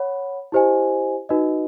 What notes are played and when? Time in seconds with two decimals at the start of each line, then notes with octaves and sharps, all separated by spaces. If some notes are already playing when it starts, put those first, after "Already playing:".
Already playing: C#5 F#5 B5
0.52 E4 G4 C5 D#5 G#5
1.29 D#4 F#4 B4 D#5